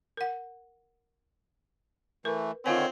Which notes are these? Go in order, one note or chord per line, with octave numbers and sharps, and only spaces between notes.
A#4 F#5
E3 A3 A#4 B4
D3 D#3 C4 F4 C#5 F5 G#5